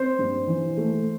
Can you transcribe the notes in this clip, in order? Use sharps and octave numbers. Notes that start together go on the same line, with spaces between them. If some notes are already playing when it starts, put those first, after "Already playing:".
Already playing: C4 C5
G2
E3
A3